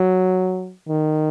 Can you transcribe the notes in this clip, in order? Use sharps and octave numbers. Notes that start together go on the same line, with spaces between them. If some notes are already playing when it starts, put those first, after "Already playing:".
Already playing: F#3
D#3